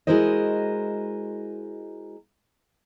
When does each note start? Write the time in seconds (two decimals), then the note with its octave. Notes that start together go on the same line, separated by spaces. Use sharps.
0.07 G#3 E4 F#4 A#4 C5 D#5